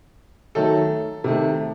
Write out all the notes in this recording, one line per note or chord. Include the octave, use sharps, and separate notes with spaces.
D#3 F#3 A3 A4
C3 D#3 A3